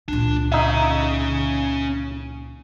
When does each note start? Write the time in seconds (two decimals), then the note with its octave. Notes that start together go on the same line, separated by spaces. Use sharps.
0.08 C#2 A#2 D4
0.52 C#4 D#4 E5 F5